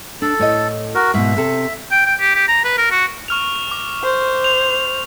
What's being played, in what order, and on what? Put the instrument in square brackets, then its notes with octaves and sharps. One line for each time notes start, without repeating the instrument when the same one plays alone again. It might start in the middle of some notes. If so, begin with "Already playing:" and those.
[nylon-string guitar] D4 [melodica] A4
[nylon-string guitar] A2 C#5 D#5
[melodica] F#4 A#4
[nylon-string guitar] G#2 B2 [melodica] E5
[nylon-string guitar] C3 C4 A4
[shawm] G5
G5
G4
G4
A#5
B4
A#4
F#4
[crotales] C#6 F6 F7
D6
[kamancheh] C5
[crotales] F7